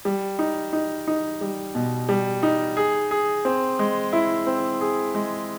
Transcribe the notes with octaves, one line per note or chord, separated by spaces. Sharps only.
G3
D#4
D#4
D#4
G3
B2
G3
D#4
G#4
G#4
C4
G#3
E4
C4
G#4
G#3